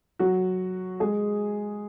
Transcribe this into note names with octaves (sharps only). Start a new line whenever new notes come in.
F#3 F#4
G#3 G#4